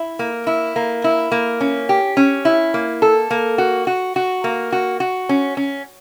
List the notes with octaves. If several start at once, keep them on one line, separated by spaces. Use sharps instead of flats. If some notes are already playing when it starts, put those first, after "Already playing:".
Already playing: E4
A#3
E4
A#3
E4
A#3
C#4
G4
C#4
E4
A#3
A4
A#3
F#4
F#4
F#4
A#3
F#4
F#4
C#4
C#4